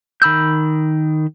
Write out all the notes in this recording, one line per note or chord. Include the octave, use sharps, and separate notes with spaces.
D#3 B5 E6 G6